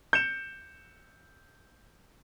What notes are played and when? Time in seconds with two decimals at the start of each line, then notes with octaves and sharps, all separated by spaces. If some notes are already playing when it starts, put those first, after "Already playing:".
0.13 G6 C#7 E7